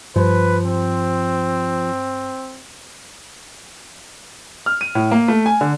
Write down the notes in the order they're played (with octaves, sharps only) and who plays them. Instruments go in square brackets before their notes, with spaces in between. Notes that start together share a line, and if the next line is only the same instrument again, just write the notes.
[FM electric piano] G2 [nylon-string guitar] F3 [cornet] B4
[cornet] C4
[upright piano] F6
D#7
A2
A#3
A3
G#5
D3